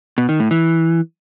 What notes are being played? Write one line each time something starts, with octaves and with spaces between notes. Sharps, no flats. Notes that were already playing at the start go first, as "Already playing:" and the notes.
B2
D#3
A2
E3